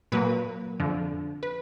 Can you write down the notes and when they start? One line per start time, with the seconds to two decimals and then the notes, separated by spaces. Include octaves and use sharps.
0.12 A#2 F#3 A#3 B4
0.80 F2 D3 F3
1.43 B4